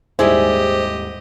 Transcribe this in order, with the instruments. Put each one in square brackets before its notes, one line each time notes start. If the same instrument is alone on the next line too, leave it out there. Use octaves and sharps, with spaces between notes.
[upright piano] D#1 G#2 [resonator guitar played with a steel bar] E4 G#4 D5 [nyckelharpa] G4 D#5 [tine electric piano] C5